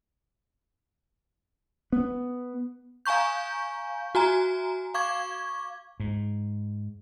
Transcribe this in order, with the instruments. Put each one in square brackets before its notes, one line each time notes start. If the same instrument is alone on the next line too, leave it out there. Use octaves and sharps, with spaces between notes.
[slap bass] B3
[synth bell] F5 G#5 A#5 C#6 G6
F#4 G#5 A#5
F5 C#6 D6 G#6
[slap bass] G#2